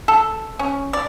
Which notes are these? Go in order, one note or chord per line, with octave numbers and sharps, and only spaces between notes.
A4
C#4
D5